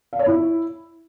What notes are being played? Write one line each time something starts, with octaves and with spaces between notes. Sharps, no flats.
F5
C#5
E4